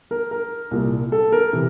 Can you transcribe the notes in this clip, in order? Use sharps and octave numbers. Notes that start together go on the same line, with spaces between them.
A#4
A#4
C2 A#2
A4
A#4
C3 E3